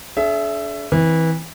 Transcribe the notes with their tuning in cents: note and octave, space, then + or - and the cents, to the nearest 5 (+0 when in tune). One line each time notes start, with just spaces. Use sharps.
D4 -30 G#4 +45 E5 +15
E3 -20 C4 +0